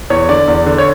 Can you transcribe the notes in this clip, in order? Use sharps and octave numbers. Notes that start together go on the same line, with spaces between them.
E2 C#5
D3 D5
E2
D3
C#5